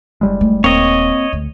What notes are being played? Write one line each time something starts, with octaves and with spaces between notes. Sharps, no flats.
F#1 G3 G#3
A3
D#1 A#3 C4 C#5 D#5
D2